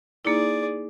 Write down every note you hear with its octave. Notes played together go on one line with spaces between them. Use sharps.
A#3 D#4 E4 G#4 D5